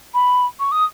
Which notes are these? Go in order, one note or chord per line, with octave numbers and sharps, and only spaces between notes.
B5
C#6
D#6